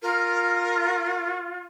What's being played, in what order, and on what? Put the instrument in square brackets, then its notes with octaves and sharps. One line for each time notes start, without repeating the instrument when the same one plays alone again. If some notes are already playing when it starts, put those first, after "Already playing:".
[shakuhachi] F4 [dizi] A#4